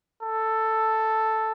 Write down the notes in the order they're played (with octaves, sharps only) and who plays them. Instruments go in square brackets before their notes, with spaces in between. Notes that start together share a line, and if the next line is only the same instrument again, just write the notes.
[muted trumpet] A4